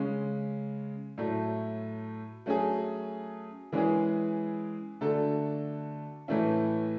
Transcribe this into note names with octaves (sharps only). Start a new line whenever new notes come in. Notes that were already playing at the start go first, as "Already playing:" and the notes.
Already playing: C#3 G#3 C#4
A2 F#3 A3
F#3 A3 C#4 G#4
E3 G#3 C#4 E4 G#4
D3 A3 D4 F#4 A4
A2 E3 A3 C#4 E4